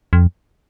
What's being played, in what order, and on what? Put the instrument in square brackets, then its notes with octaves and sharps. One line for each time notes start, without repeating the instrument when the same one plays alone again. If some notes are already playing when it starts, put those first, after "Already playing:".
[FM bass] F2